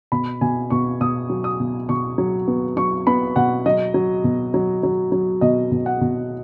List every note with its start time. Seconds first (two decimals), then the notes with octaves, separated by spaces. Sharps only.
0.12 B2 B5
0.41 B2 G#5
0.70 B2 C#6
1.01 B2 D#6
1.30 F#3
1.44 D#6
1.60 B2
1.89 B2 C#6
2.18 F#3
2.48 B3
2.77 F#3 C#6
3.07 B3 B5
3.36 B2 F#5
3.66 F#3 D#5
3.94 F#3
4.24 B2
4.54 F#3
4.83 F#3
5.12 F#3
5.41 B2 D#5
5.72 B2
5.86 F#5
6.01 B2